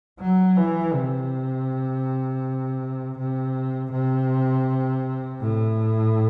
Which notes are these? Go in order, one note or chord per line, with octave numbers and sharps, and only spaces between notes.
F#3
E3
C3
C3
C3
A2